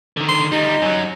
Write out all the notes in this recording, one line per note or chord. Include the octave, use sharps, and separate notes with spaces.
D3 D#3
C6
D2 G3 D#4
F#2 F#3